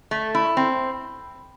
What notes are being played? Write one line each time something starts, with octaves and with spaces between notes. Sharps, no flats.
A3
E4
C4